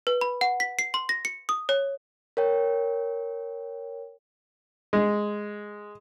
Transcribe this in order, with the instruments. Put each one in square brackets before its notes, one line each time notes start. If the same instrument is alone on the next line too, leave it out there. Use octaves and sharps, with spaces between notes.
[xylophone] B4
B5
F#5
B6
C7
C6
A#6
C#7
D#6
C#5
[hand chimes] A#4 C#5 G5
[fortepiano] G#3